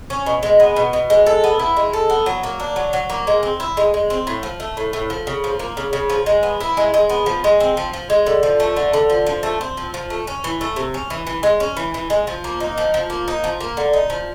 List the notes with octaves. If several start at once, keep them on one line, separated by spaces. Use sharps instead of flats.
C#4
B2
G#3
B3
B2
B2
G#3
A4
B3
E4
G#3
A4
B3
F#3
A#3
D4
F#3
F#3
A#3
G#3
C4
E4
G#3
G#3
C4
A2
F3
A3
A2
A2
F3
C#3
F3
A#3
C#3
C#3
F3
G#3
B3
E4
G#3
G#3
B3
F3
G#3
C4
F3
F3
G#3
D3
F3
A3
D3
D3
F3
F3
A3
C4
F3
F3
A3
C#4
E3
A3
C3
C#4
E3
E3
G#3
C#4
E3
E3
G#3
F3
A#3
D#4
F3
F3
A#3
D#4
F3
A#3
D3
D#4
F3